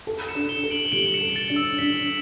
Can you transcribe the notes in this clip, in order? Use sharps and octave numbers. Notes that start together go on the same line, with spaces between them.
A4
C#7 E7
D4
E7 G7
A4
D7 F#7
G3 D7 F#7
C#7 E7
A4
A6 C#7
D4
E6
D4 B6